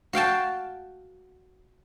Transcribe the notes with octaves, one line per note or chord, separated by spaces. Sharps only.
F#4 F5 G5 A5